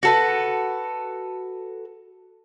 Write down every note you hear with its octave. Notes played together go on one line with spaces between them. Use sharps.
F#4 A4 B4